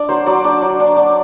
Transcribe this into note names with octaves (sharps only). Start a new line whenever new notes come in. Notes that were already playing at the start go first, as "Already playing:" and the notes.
Already playing: D4 D5
F#3 C5
F#3 D5
D4 D5
F#3
D4
D4